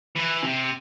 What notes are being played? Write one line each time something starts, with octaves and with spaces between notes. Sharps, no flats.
E3
C3